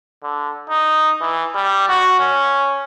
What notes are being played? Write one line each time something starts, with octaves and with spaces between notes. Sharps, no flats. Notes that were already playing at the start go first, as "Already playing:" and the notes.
D3
D#4
E3
G3
F#4
C#4